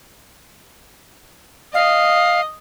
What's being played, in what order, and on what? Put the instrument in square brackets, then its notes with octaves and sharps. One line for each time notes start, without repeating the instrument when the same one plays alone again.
[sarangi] D#5 [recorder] F5